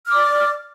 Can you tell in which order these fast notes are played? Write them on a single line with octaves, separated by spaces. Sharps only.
F6 D6 D5